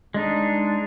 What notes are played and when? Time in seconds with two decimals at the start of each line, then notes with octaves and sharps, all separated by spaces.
0.14 G#3 D4 D#4